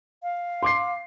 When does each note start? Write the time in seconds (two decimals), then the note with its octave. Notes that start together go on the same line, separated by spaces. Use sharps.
0.23 F5
0.63 C6 D6 C7